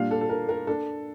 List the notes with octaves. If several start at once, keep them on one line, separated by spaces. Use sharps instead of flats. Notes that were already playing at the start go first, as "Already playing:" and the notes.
Already playing: A#2 G3 D4 F5
A4
A4
A#4
A#4
D4 A4